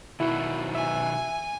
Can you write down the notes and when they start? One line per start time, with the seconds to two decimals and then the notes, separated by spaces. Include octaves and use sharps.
0.20 B2 D#3 E4 F#4
0.75 E5 G#5